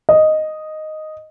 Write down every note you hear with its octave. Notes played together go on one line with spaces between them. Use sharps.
D#5